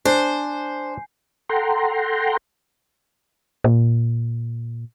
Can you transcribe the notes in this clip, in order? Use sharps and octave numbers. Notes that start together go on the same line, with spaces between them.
D4 C5 G#5 G6 C7
A4 F#5 G5 A#5 C6
A#2